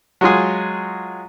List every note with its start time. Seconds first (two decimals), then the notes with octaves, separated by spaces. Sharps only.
0.21 F#3 G#3 F4 G#4